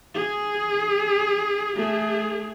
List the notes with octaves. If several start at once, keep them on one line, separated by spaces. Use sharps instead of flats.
G#4
A3 G#4